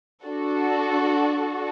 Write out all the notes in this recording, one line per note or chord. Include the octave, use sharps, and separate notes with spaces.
D4 F#4 A4